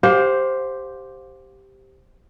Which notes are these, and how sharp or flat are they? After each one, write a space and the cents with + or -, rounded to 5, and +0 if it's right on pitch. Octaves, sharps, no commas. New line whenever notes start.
G4 +0 C5 +5 F5 +35